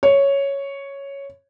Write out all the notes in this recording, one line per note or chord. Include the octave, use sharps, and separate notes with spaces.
C#5